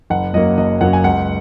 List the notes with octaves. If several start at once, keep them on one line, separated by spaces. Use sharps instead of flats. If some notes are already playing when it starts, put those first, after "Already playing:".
F#1 F#5
F#2 F#3 A#3 D#5
F#1 D#5
F#2 F#3 A#3 F#5
G#5
C#2 F#5